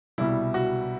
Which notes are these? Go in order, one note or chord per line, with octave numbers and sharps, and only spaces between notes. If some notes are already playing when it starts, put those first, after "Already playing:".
C2 B2 G3 E4
F#4